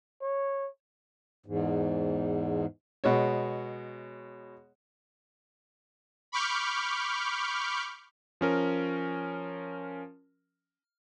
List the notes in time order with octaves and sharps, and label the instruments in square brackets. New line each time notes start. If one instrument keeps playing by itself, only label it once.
[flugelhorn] C#5
[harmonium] E2 G#2
[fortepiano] B2 G#3 C#5
[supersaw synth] B5 C#6 D6 F6 G6
[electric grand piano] F3 C#4 A#4